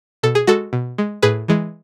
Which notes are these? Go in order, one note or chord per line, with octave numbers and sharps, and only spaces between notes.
B2 A4
G#4
G#3 F#4 A4
B2
G#3
A2 G#4 B4
E3 G#3